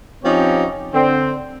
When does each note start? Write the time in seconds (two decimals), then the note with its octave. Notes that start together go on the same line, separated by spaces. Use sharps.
0.24 F3 C4 C#4 D#4 G4 C#5
0.93 D3 C4